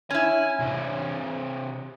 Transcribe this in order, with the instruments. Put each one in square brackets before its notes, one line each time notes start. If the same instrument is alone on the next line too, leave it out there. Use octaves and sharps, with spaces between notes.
[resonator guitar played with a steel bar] C#4 E4 [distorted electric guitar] G#5
[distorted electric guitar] C3 C#5